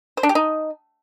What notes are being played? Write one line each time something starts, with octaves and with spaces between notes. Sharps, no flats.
C5
D4
G4
D#4